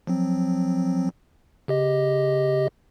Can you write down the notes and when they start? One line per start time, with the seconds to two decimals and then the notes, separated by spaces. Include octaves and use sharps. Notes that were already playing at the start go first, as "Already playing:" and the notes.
0.07 F3 F#3 C4
1.68 C#3 G4 D#5